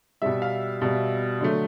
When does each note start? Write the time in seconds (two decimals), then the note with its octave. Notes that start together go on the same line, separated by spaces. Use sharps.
0.22 B2 G3 E5
0.42 F5
0.82 B2 G3
1.41 D3 F#3 A3